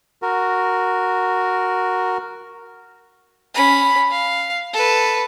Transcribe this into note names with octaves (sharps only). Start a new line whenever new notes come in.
F#4 A#4
C#4 B5
F5
A4 B4